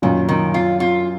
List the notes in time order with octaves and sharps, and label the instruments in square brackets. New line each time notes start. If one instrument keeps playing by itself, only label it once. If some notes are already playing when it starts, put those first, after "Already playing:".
[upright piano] F#2 A#2 [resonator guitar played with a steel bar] D#3
[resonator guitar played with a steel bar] D#3
F4
F4